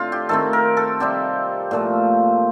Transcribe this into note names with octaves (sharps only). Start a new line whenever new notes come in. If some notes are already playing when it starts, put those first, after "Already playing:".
Already playing: A2 C4 D4 F4
G4
D#3 A3 C4 A4
A#4
A4
C3 G3 C4 G4
A#2 F3 A3